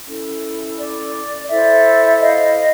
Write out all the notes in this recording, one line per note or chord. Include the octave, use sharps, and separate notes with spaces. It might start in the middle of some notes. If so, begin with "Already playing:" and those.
C#4 E4 A4
D5
E4 A4 C5 D5 E5
D#5 F5